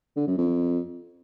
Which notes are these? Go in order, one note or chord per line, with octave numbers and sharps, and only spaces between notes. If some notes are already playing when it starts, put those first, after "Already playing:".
D3
F#2
F2